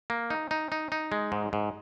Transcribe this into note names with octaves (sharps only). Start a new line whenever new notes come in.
A#3
D#4
D#4
D#4
D#4
G#3
G#2
G#2